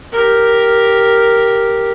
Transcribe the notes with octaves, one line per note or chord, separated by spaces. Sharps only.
G4 A#4